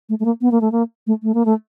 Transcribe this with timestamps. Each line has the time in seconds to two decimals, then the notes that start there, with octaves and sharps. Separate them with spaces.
0.09 A3
0.20 A3
0.25 A#3
0.41 B3
0.51 A#3
0.61 A3
0.72 A#3
1.07 A3
1.23 A3
1.34 A#3
1.45 A3